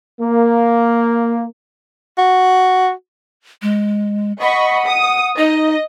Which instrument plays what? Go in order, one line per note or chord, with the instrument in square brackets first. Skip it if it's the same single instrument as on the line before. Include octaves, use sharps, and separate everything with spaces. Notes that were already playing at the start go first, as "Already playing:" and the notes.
[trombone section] A#3
[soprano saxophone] F#4
[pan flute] G#3
[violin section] D#5 B5 C#6 [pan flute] F#5
[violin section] D#6
[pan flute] D#4 [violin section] D#5